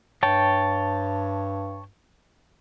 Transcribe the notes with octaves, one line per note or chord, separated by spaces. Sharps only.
G2 C#5 G5 A5